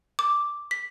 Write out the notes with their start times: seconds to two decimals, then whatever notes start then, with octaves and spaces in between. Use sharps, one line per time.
0.19 D6
0.71 B6